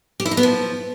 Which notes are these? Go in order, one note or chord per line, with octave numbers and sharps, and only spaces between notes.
G4
E4
D#4
B3
F3